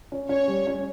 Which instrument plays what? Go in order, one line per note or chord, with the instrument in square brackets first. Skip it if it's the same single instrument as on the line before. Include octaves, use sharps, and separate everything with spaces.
[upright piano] C#4
[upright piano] C#4 [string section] C#5
[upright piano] G3
C#4